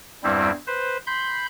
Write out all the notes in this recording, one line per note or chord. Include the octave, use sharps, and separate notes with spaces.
E2 G2 G3 C4 E4
B4 C5
B5 C6 G6